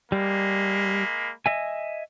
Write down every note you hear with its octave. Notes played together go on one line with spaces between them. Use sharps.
G3 G#3 A#3 B5
D#5 E5 G#5